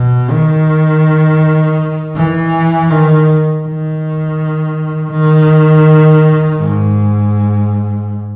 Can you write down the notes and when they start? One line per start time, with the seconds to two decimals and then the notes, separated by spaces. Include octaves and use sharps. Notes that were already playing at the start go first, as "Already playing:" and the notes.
Already playing: B2
0.30 D#3
2.15 E3
2.90 D#3
3.63 D#3
5.11 D#3
6.59 G#2